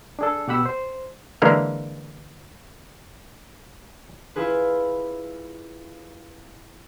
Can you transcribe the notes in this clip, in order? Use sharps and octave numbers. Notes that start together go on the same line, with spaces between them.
D4 G#4 A4
B2 G4 F#5 B5 E6
C5
D3 E3 G#3 A#3 A#4
E4 F4 G#4 B4